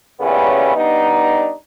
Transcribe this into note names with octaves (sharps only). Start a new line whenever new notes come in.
A#2 C#3 G3 B3 C#4 E4
G3 B3 D4 D#4